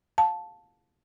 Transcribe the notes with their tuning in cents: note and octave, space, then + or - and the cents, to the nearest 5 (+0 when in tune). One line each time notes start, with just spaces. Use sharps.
F5 +30 A5 -5